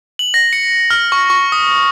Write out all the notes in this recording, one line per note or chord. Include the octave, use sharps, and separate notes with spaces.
F#7
A#6
C#7
F6
C#6
C#6
D#6